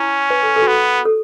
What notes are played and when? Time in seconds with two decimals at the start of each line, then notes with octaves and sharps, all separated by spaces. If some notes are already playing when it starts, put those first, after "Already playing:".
Already playing: C#4 E4
0.30 B4
0.43 A4
0.56 A4
0.62 F#4
0.68 B3 A4
1.05 A4